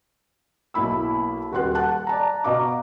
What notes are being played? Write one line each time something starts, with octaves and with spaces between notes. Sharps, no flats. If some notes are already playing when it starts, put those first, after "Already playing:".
B1 A#3 E4 B5 E6
D#1 F#4 B4 C6 F#6
F#5 A5 F#6
D5 A5 A#5
B2 D#5 F5 A#5 D6